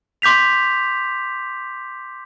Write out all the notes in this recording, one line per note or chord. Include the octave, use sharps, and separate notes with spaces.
C6 D6 G6 B6 F7